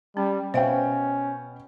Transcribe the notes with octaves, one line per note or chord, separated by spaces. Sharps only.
G3 C#4
B2 C#4 C5 E5 F5 G5